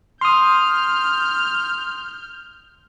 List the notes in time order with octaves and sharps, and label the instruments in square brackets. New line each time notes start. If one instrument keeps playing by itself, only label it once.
[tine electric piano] C6 D#6 [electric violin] F6 G6